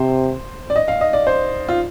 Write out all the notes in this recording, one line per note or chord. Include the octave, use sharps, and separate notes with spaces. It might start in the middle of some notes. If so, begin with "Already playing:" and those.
Already playing: C3 C5
D5
D#5
F5
D#5
D5
C5
F4